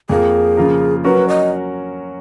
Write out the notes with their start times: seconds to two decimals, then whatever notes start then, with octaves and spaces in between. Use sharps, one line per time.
0.09 F2 F3 A#3 G#4
0.57 C#3 F3 A#3 F4 A#4
1.04 F#3 C#4 F#4 A#4 B4
1.28 D#5